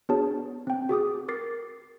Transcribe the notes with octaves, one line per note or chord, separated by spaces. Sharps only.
B3 D4 F#4 G#4 C#5 A5
C4 G5
F#4 G#4 D6 D#6
A#4 D6 A6 C7